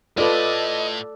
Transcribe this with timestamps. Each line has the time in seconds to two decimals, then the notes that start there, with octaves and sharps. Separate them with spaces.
0.18 A2 F4 A4 B4 D5 D#5